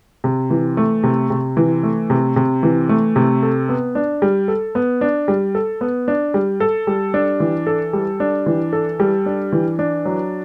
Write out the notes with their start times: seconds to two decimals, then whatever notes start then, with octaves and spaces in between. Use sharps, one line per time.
0.24 C3
0.50 E3
0.77 A3
1.03 C3
1.30 C3
1.57 E3
1.83 A3
2.10 C3
2.36 C3
2.63 E3
2.89 A3
3.16 C3
3.43 A4
3.69 B3
3.95 D4
4.22 G3
4.48 A4
4.75 B3
5.01 D4
5.28 G3
5.55 A4
5.81 B3
6.08 D4
6.34 G3
6.60 A4
6.87 G3
7.14 D4
7.40 E3
7.67 A4
7.93 G3
8.20 D4
8.46 E3
8.73 A4
9.00 G3
9.26 D4
9.52 E3
9.79 D4
10.05 F#3